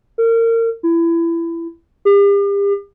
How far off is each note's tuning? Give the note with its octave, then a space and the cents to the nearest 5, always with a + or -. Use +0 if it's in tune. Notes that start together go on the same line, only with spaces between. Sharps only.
A#4 -30
E4 +25
G4 +40